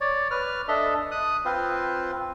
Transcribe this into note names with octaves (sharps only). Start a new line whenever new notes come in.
C#5 D5
B4 F6
D4 A4 D#5 E5
D#6 F#6
C4 F4 B4 C5